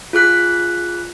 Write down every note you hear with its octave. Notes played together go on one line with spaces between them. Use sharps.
F4 G#4 F#6 B6